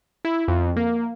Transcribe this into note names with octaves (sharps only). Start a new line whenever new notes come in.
E4
F2
A#3